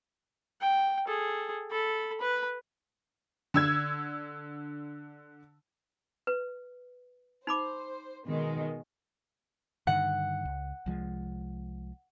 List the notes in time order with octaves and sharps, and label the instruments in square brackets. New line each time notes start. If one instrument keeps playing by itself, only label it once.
[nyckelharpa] G5
G#4 A4
A4 B5
B4 B5
[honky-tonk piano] D3 E6 G#6
[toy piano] B4
[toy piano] D#4 B5 D6 [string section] C5
[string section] B2 D#3 G#3
[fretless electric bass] G2 D3 D#3 [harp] F#5
[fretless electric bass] C#2
C2 F3 G#3